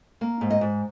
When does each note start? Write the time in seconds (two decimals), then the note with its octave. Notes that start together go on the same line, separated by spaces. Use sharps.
0.21 A#3
0.41 G#2
0.50 D#5
0.61 G#2